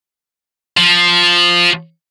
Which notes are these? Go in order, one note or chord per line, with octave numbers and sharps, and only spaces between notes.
F3